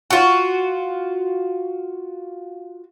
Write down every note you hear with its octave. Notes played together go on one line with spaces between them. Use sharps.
F4 F#4